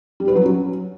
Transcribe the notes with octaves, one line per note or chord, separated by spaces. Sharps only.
G3
B4
F#3
C#4